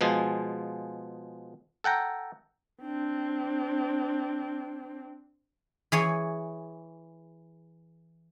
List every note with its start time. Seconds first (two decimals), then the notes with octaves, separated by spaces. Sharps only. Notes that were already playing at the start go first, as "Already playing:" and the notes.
0.01 B2 F3 G#3 G#4
1.84 A4 F#5 G5 A#5
2.82 C4 D4
5.92 E3 G#4 C#5